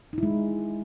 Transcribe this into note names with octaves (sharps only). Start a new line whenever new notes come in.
G#3 D#4 E4